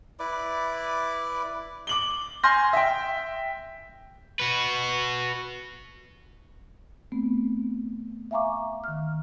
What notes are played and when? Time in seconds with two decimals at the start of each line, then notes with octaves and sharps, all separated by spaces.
0.20 E4 B4 D5 D6
1.87 D6 F#7 G7
2.44 G#5 C6 F6 G6 A#6
2.73 E5 G5
4.40 F#4 B4
7.12 A3 B3 C4
8.31 E5 F5 G#5 A#5 C#6 D6
8.84 D#3 F6